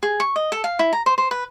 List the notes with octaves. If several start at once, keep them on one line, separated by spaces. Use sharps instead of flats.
G#4
C#6
D#5
A4
F5
E4
A#5
C5
C5
B4